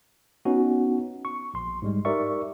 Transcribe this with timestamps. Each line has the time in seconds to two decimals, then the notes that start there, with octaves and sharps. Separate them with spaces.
0.45 B3 C#4 D#4 F#4
1.25 C#6
1.54 A#1 C6
1.82 G#2 G3 G#3
2.05 D#4 G4 A#4 D5 E5 C#6